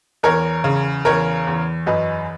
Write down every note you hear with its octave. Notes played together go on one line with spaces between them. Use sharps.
E2 A#4 C#5
C#3
E2 A#4 C#5
E2
F#2 B4 D#5